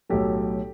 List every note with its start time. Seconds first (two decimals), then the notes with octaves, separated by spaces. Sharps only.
0.09 B1 A2 F#3 G4 A4